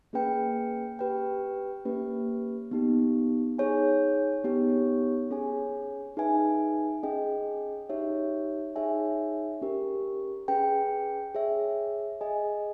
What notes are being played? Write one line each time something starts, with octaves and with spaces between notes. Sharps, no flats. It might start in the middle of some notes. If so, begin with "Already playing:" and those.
A#3 C#4 G#4 B4 G5
G4 B4 G5
A#3 C#4 G4 B4
B3 D#4 G4
D#4 G#4 C#5 G#5
B3 D#4 G4 C#5
C#4 G#4 C#5 G#5
D#4 G#4 B4 E5 G#5
C#4 G#4 D#5 G5
D#4 G4 C#5 E5
D#4 G#4 C#5 E5 G#5
C#4 G4 A#4
C#4 G#4 B4 G5
G#4 C#5 E5
G#4 D#5 G#5